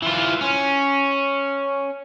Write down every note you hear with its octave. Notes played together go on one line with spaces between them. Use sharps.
E3 F4
C#4